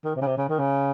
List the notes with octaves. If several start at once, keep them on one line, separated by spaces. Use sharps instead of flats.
D#3
C3
C#3
C3
C#3
D#3
C#3